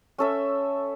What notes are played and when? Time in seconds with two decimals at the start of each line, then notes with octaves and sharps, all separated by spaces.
0.18 C#4 A4 E5